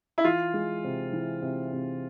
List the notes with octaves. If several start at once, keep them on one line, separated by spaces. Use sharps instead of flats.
E4
E3 F4
G#3
C3
E3
C3
C3